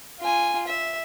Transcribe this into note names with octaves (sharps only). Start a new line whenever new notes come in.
F4 G#5
E5